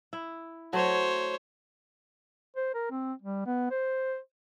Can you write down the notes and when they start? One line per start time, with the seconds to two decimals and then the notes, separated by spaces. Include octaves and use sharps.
0.13 E4
0.73 F#3 A3 C5 C#5
2.56 C5
2.74 A#4
2.91 C4
3.22 G3
3.46 B3
3.71 C5